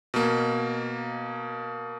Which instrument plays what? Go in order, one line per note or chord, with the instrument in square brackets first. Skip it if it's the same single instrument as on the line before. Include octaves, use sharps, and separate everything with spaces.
[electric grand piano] B2 A#3